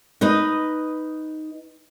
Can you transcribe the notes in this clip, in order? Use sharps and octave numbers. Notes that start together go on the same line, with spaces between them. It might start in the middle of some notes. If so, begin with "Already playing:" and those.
D#4 B4 D#5